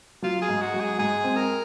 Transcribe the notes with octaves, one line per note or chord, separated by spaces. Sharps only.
F#3 F4
G#4
G#2
F#4
F#3
G#4
G#2 G#4
C4
A#4